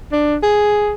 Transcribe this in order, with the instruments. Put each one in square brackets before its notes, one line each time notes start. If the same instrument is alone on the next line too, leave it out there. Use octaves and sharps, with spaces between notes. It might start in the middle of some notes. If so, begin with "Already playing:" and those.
[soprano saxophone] D4
G#4